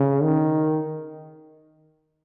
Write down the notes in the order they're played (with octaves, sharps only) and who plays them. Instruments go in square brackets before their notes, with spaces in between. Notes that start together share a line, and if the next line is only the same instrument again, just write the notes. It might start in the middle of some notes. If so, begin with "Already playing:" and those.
Already playing: [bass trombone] C#3
D#3